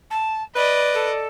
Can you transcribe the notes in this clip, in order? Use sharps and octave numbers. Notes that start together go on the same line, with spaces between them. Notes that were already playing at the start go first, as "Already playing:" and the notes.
A5
B4 D5 D#5 B5
A4